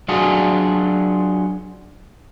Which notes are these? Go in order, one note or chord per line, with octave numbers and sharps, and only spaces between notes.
F#3 D4 F4 F#4 G#4